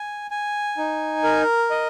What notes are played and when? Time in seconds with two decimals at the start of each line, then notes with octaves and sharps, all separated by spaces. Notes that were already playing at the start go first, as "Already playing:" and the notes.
Already playing: G#5
0.31 G#5
0.78 D#4
1.24 A#4
1.70 D#5